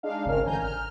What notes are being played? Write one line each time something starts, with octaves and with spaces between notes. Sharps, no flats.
G#3 D4 D#4 F5
G1 C#2 C4 C#4 A#4 F6
A1 D3 G#5 A#5 G6
F6